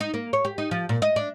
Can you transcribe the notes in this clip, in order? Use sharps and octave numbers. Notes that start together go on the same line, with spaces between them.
D#4
A#3
C#5
G4
D#4
F3
A#2
D#5
D4